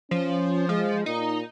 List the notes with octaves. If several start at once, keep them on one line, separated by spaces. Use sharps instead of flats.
F3 C#4
F3 G#3
A#2 D#4